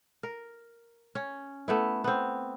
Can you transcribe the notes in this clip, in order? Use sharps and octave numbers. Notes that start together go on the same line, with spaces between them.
A#4
C#4
A3 B3 E4
B3 C4